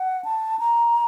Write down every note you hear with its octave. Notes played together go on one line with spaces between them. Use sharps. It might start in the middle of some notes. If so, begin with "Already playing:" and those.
Already playing: F#5
A5
A#5